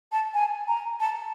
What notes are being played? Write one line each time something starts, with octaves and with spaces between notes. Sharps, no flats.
A5
G#5
A#5
A5